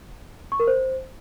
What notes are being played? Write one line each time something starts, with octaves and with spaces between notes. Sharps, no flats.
C#6
A#4
C5